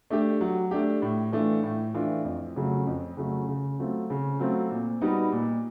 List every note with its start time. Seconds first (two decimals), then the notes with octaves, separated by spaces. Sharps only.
0.10 A3 D4 G4
0.41 F#3
0.71 A3 D4 G4
1.02 A2
1.32 E3 A3 D4 F4
1.63 A2
1.94 E3 A3 D4 F4
2.25 F2
2.56 C#3 F#3 A3
2.87 F2
3.17 C#3 F#3 A3
3.48 C#3
3.79 F#3 A3 C4 F4
4.10 C#3
4.39 F#3 A3 C4 F4
4.71 A#2
5.01 G3 B3 D#4 F#4
5.32 A#2